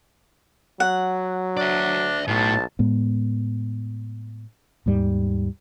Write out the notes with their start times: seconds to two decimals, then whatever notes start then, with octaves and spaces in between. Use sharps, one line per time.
0.80 F#3 F#5
1.57 D4 D5 E5
2.28 B1 A2 A5
2.79 A2 G#3 B3
4.86 D#2 G#2 G3